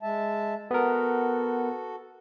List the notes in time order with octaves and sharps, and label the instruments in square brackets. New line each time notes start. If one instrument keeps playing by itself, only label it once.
[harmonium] G#3 E5 A5
[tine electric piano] B3 A#4 [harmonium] F#4 A4